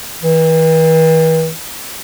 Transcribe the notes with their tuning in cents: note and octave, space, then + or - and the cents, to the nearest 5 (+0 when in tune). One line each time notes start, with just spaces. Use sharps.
E3 -40